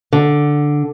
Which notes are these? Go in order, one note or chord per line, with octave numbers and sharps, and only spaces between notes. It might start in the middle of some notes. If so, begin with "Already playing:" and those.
D3